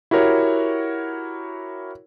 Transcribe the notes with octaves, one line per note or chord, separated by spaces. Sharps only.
E4 F#4 G4 A#4 C#5